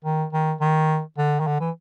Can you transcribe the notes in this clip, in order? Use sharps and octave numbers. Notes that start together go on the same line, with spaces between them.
D#3
D#3
D#3
D3
D#3
D3
E3